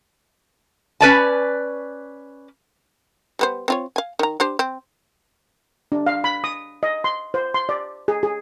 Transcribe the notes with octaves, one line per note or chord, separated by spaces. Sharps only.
C#4 B4 D5 A5
G3 B3 C5
C4 F4 C#5
F5 G#5
D#3 A#5
D4 G4 C5
C4
D4
F5
B5
D#6
D#5
C6
C5
C6
D5
G#4
G#4